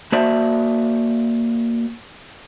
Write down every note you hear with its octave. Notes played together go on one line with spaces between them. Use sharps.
A#3 F#4 C5 D5 E5 A5